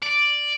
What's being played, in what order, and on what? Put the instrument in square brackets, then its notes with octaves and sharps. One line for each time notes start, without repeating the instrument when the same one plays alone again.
[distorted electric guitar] D5